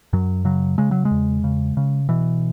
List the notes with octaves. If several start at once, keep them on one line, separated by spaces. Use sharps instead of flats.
F#2 F#3
C#3 F#3
C#3 G#3
F#3
G#3
E2
C#3
C#3
B2 E3